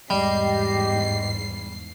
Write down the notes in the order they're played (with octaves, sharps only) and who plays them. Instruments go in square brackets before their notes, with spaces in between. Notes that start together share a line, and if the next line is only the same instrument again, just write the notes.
[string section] E2 G#2 C7 [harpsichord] G3 [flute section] G4 D#5